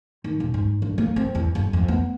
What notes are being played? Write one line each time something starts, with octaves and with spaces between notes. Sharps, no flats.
D#3
D#1
G#2
G2
A#3
C4
E2
F#1
F2
B3